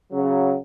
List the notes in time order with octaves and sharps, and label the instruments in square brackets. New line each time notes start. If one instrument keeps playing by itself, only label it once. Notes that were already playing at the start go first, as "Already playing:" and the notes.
[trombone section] C#3 F#3